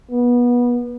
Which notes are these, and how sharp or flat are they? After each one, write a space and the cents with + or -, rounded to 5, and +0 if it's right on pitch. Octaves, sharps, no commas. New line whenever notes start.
B3 -25